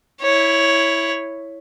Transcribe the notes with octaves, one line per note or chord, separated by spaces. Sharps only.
E4 C#5